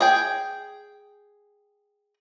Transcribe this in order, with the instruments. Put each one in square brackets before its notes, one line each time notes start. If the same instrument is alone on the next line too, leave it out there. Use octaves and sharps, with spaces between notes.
[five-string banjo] G#4 G5